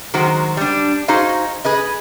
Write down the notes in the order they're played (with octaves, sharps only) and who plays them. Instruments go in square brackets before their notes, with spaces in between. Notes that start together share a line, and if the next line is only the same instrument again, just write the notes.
[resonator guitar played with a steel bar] D#3 F#3 G#3 F#4 C5
G3 D4
D#4 F#4 G#4 C5 D#5 F5
G#4 B4 D#5